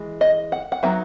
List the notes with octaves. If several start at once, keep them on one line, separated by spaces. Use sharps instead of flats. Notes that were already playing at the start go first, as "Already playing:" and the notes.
Already playing: E3 G#3
D#5
F#5
F#5
F#3 B3 D#4 E5